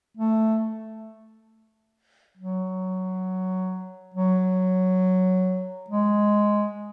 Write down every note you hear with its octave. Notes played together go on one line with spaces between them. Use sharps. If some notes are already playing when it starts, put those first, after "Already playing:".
A3
F#3
F#3
G#3